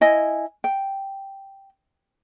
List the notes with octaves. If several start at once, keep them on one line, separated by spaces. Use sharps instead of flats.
E4 D#5 G#5
G5